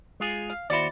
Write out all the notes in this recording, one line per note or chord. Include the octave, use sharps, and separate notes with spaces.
G#3 F4 G#4
F5
D#2 E4 F#4 C5 D5